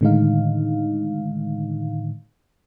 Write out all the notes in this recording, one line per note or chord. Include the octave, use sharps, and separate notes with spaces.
A2 D3 D#3 G#3 D#4 F5